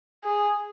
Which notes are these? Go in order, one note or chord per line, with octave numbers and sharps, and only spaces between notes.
G#4